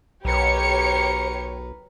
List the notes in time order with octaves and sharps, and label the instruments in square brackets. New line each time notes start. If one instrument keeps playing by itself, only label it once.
[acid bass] B1 [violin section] G4 C#5 C#7 [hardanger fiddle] A#4 B4